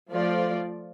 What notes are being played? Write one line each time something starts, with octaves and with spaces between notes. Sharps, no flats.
F3 A3 F4 D5